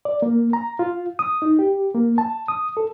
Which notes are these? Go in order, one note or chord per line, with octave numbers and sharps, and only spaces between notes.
D5
A#3
A#5
F4
D#6
D#4
G4
A#3
A5
D#6
A4